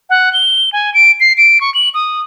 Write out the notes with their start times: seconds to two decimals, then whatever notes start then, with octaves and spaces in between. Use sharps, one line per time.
0.10 F#5
0.33 G7
0.73 G#5
0.94 D7
1.20 C7
1.38 D7
1.61 C#6
1.74 F#7
1.94 D#6